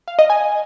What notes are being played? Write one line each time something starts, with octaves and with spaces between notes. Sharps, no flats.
F5
D#5
G#5